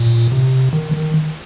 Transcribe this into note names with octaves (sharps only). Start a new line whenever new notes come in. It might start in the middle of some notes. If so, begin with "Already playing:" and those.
Already playing: A#2
C3
D#3
D#3